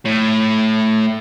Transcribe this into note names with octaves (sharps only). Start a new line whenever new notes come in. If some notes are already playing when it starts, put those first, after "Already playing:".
A2